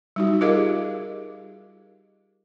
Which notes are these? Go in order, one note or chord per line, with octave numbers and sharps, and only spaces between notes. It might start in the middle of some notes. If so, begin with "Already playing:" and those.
G3 D#4 F#4
F4 G4 G#4 A#4 D#5 F5